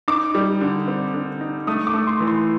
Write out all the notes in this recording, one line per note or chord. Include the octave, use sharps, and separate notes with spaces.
D#4 D6
G3
D3
C4
D3
D#4
A3 D#6
D6
A3
C6
E3
C6